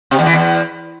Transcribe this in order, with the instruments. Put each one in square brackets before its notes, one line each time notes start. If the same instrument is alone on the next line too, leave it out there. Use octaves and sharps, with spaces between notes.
[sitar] C3
E2
E3
E2